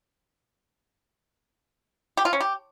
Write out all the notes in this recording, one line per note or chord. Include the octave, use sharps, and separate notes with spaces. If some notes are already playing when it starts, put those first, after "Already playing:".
G4
F4
C#4
G4